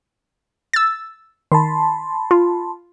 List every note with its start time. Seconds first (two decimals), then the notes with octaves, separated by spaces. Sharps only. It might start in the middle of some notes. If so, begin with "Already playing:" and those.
0.74 E6 A6
1.52 D#3 A5 B5 C6
2.31 F4